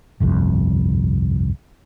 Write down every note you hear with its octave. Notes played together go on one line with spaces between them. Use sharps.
G1 C2 F2